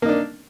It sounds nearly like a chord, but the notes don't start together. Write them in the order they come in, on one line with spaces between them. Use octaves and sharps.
A#3 D#4 D4